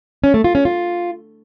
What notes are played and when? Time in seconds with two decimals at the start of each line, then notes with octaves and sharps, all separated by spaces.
0.24 C#4
0.34 A3
0.44 F4
0.55 C#4
0.65 F4